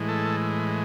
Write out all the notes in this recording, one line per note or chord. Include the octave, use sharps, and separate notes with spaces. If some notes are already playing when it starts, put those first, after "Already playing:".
Already playing: A2 E3 G#3
A4